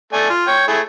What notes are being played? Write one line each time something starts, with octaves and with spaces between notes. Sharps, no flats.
A3 D5 G#5
F4
C#5 G5
A3 E4 G#4